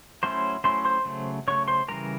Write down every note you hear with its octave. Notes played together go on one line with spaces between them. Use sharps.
F#3 A3 C#4 E4 C5 C6
F#3 A3 C#4 E4 C5 C6
C5 C6
C#3 F#3 A3
C#3 F#3 A3 C#5 C#6
C5 C6
C#3 E3 G3 A#4 A#5